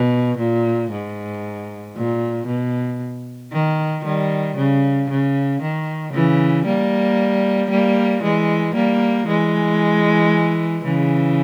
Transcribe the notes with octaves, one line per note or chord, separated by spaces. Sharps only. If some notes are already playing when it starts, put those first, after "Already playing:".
Already playing: B2
A#2
G#2
A#2
B2
D#3
D#3 G3
C#3
C#3
D#3
C#3 E3
G3 A#3
G3 A#3
E3 G#3
G3 A#3
E3 G#3
C#3 E3